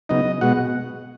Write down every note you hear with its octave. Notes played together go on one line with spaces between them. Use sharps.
C#3 F#3 B3 D#4 D#5
B2 G#3 B3 F#4 F#5